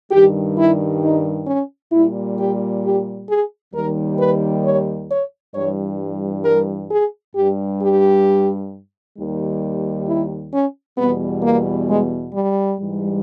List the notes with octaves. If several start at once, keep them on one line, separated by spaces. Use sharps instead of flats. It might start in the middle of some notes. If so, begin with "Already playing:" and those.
G2 D#3 G3 G4
E4
D#4
C#4
A#2 G3 E4
G4
G4
G#4
D#2 D#3 G3 A#4
B4
C#5
C#5
G2 E3 G3 C#5
A#4
G#4
G2 G3 G4
G4
D#2 D#3 G3
E4
C#4
E2 B2 G3 B3
A#3
G#3
G3
G#2 E3 G3